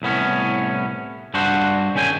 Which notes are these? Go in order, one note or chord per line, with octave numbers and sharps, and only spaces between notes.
C2 A2 B3 C#4
G2 D4 F#4 C5 F#5
D#3 C#4 G#4 G5 G#5